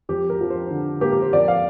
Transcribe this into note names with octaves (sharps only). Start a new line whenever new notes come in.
F2 G4
A#4
F3
C5
D3
A#3 G4
A#4
C5
F2 D5
F5